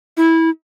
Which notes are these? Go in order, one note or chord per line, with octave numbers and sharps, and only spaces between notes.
E4